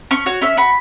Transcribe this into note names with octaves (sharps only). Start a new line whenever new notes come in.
C#4 C#6
F#4 C#5
C#4 E5
F#4 B5